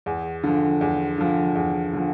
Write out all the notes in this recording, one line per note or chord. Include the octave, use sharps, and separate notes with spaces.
E2
D3 F3
E2
D3 F3
E2
D3 F3